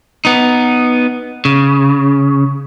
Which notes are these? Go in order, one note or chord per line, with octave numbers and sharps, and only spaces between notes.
B3 D#4
C#3